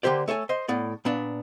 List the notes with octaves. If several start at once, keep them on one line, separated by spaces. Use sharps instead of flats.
D3 A#3 G4 C5 D5
A3 A4 C#5 G#5
C5 D#5
A2 B3 D5
A#2 B3 D4